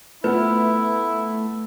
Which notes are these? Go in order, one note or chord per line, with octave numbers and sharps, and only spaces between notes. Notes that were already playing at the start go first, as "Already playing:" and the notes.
A3 B3 E4 F4 B4